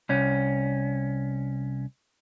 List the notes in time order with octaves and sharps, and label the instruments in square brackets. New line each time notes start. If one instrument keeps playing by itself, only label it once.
[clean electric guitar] C2 C#4